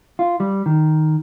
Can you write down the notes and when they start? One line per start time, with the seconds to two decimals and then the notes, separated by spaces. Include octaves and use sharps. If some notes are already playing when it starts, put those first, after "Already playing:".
0.19 F4
0.40 G3
0.66 D#3